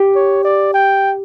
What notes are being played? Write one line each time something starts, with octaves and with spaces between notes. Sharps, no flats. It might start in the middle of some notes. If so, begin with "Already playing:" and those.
Already playing: G4
C#5
D5
G5